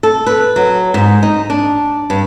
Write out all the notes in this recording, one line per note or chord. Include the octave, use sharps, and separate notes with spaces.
A4
B4
F#3
G#2
D#4
D4
G2